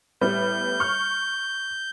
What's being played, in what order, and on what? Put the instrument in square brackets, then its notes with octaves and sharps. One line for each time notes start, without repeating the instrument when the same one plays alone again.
[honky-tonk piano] A2 G3 B3 [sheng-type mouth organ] G6
[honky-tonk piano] C#6 F6